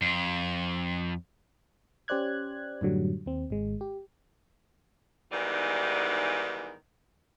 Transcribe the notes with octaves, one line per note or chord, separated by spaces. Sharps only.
F2
C#4 G4 C5 D5 F#6 G#6
F#2 A2 D3 F#3 G3
D#2 C4
G#1 G#3
G4
G#2 D#3 E3 G3 B3 D5